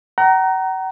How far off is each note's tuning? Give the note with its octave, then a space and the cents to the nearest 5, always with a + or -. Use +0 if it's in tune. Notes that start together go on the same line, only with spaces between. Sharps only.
F#5 +40 A#5 +0